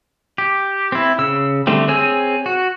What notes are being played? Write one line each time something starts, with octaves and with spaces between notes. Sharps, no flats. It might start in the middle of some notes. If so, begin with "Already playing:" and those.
G4
C4 E4
C#3 E6
D3 G3 A3 C4
C4 G#4 C#5 G#5 E6
F#4